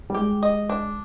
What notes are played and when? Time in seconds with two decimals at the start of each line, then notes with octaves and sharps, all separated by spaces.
0.10 G3
0.14 G#3 G4
0.43 D#5
0.69 D4